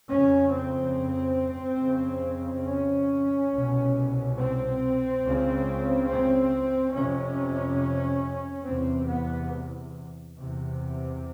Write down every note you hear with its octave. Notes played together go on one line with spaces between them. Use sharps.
F2 C#3 C#4
C4
F2 C#3
C#4
C2 B2
C4
C#2 C#3
C4
F2 C3 C#4
E2 C3 C4
B3
E2 C3